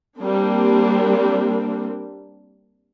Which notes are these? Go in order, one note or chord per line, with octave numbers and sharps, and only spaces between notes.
G3 A#3 C4 D4